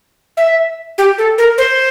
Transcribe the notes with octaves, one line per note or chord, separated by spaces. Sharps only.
E5
G4
A4
A#4
C5